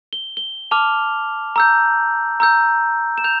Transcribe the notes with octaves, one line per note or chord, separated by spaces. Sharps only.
G7
G7
A5 D6 F6 F7
A#5 E6 G6
A#5 E6 G6
E7
G6 F7